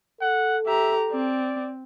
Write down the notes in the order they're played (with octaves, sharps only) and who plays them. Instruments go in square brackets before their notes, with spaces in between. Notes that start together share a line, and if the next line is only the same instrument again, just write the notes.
[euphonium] A4 [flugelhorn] F#5
[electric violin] G4 A#5 [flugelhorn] E5
[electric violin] C4 [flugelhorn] D5